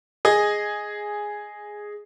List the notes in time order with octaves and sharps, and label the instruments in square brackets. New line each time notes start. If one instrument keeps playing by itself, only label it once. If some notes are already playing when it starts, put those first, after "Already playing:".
[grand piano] G#4 D#5